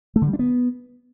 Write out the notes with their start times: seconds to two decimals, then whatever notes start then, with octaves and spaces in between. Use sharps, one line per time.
0.16 A3
0.22 D3
0.27 G3
0.33 D4
0.39 B3